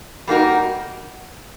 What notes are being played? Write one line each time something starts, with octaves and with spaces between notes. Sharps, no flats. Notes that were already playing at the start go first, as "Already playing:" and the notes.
G3 A#3 D#4 F#4 A#4